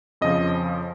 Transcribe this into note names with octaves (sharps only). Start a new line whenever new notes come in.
F2 C#3 F3 D#5